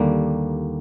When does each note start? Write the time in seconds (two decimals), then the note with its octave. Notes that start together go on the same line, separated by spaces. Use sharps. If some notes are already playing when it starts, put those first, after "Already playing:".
Already playing: D#2 D3 G3 A#3